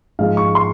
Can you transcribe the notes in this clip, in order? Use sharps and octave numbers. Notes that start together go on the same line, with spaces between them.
G#2 F3 G#3 F5
C#6
C6